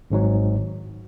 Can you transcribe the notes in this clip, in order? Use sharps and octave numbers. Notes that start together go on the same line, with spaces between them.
G#1 G#2 F#3